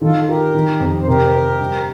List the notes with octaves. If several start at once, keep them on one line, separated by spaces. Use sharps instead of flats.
D#3 F4 A4
F4 G4 A#4
D#3
F2
C5
C3 G4 A#4
C4
G2